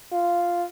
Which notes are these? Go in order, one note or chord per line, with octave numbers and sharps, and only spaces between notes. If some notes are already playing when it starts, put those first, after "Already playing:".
F4